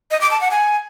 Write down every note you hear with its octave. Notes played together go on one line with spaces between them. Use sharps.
D#5
D6
A5
F#5
G#5